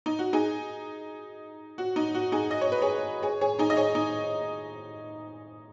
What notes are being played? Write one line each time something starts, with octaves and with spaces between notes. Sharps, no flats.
D#4
F#4
D#4 G#4
F#4
D#4
F#4
D#4 G#4
D#5
C#5
B4
G#4 C#5
G#4 C#5
G#4 C#5
D#4 G#4
D#5
G#4 C#5
D#4